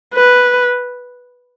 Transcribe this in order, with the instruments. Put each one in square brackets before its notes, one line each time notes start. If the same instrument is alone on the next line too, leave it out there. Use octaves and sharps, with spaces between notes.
[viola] B4